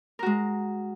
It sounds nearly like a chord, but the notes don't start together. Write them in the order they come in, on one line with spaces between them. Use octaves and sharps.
A#4 F#4 G#3